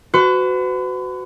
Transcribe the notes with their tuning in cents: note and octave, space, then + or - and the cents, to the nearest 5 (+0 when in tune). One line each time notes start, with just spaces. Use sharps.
F#4 +0 B4 +40